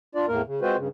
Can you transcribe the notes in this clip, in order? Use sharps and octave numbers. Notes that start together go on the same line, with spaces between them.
D4 F4 D5
E2 A2 A#3 A#4
C#3
G#3 C4 F4 F#4 B4 C5
G2 C#3